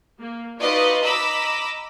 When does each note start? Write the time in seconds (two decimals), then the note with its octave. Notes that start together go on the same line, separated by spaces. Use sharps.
0.19 A#3
0.59 D#4 F4 F#4 B4 D5 D#5
1.02 D#5 A#5 B5 D6 E6